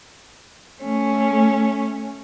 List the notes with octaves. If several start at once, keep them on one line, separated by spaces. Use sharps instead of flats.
A3 C#4